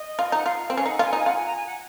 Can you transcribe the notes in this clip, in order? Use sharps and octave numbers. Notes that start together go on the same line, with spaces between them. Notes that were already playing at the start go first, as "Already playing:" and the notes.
Already playing: D#5
F4
D#4
F#5
F4 F5
C4
C#4
D#4 F#5
F4 F#5
G#5
D#4
G#5
F4 F#5
G#5
A#5
G#5
F#5